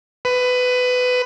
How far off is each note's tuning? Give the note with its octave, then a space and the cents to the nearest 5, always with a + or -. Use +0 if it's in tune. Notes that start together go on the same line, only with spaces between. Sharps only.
B4 +20